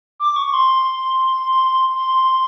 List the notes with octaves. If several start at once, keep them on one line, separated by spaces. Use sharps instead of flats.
D6
C#6
C6
C6